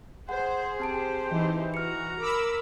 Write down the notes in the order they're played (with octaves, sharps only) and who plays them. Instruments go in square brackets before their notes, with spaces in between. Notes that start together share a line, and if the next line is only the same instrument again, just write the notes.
[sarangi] G#4 [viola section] C5 [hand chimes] F#5
[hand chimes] C4 A5 D7 [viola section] G4 C5
[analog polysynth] E3 [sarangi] D#4
[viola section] F#4 [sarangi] A#5 [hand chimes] F6 C#7
[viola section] A#4 B5 [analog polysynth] D6 E6